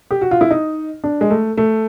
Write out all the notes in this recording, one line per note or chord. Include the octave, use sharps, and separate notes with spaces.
G4
F#4
F4
E4
D#4
D4
G#3
A3
A3